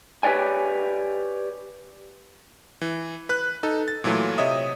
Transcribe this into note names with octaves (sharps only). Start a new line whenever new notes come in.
G4 B4 C#5 D5 G#5
E3
B4 F#6
D#4 A4
A6
A#2 E3 F#3 A3 F4
C3 C#5 D#5 E5 D#6